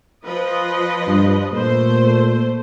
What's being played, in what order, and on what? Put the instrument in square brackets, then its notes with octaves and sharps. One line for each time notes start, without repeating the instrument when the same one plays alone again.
[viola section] F3 B4 D#5
[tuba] G2
[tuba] A#2 [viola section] A3 C5